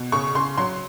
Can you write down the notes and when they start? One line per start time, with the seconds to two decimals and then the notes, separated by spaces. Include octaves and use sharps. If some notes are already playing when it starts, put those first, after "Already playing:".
Already playing: B2
0.12 C#3 C#6
0.35 C#3 C6
0.57 F#3 C6